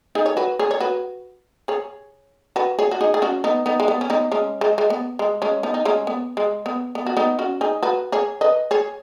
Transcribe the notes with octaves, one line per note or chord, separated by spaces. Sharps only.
D#4 G#4
C#5
F#4 B4
G#4 C#5
C#5
F#4 B4
G#4 C#5
F#4 B4
G#4 C#5
F#4
D#4 G#4
G#4
C#4 F#4
B3 D#4
B3 D#4
G#3
B3
C#4
B3 D#4
G#3 C#4
G#3
G#3
B3
G#3
G#3 C#4
B3 D#4
D#4
G#3 C#4
B3
G#3
B3
B3
F#4
B3 D#4
C#4 F#4
D#4 G#4
F#4 B4
G#4 C#5
B4 D#5
G#4 C#5